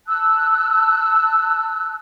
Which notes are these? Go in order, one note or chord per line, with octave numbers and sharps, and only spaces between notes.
A5 E6 F#6